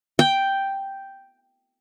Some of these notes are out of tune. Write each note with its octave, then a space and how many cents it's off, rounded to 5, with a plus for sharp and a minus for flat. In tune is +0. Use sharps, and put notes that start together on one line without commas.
G5 +0